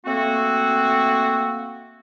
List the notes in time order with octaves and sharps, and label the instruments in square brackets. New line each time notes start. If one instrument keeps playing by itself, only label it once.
[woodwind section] A3 A#3 C4 F#4